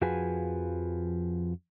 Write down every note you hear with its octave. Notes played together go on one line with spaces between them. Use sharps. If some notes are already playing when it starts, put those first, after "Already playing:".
F2 F3 F#4 G#4 B4 G#5